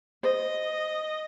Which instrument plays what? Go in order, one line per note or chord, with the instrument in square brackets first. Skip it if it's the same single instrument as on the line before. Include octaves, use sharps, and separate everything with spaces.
[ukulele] C5 [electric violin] D#5